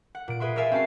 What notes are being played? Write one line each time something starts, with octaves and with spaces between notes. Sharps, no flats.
F#5
A#2 D7
G#4 B4 E5 C6
A#4 C#5 D5 E5 F5 G#5
C4 C#4 F#4 A5 C7